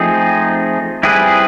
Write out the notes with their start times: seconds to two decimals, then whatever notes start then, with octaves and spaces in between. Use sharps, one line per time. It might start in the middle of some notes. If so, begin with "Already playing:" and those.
Already playing: F3 A3 C4 D#4 G#4
1.03 G3 C4 E4 G#4 B4